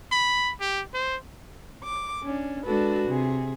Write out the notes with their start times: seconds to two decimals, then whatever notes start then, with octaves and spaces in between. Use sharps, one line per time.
0.12 B5
0.60 G4
0.94 C5
1.84 D6
2.22 C#4 D4
2.64 G#3 D4 F#4 A4 B4
3.07 C3 G#4